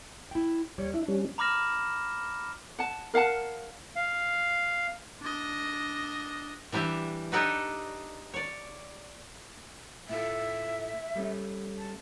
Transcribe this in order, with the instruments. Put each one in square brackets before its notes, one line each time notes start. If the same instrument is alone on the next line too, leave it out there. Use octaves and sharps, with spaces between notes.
[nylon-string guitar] E4 G5
[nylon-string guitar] D#2 G3 [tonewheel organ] C#5
[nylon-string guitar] D4 [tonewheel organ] E4
[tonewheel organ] G3 C#4
[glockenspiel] A#5 B5 D6 F6 A#6 E7
[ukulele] F#5 A5
A#4 F5 F#5 A5
[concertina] F5
[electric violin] D4 D#5
[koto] E3 G3 D4 G4 E5
D4 D#4 G4 A4 B4 D#5
C#5 D5
[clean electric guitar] A2 F4 A4 [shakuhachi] E5
[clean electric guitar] G3 A3 C#4
[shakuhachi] A5